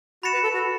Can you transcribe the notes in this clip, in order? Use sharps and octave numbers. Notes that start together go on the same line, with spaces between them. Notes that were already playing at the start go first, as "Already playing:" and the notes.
F#4 B5 A6 C#7 E7
B4
A4
F#4